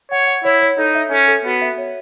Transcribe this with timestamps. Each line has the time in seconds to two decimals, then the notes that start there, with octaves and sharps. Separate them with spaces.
0.11 C#5 F#5
0.27 F#5
0.45 E4 C#5
0.62 C#5
0.78 D#4 A4
0.95 E5
1.11 C#4 A4
1.28 A4
1.45 B3 F#4
1.62 E5
1.78 C#5